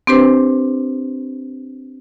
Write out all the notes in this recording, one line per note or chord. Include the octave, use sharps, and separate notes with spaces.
C4 D4 G4 B4 C5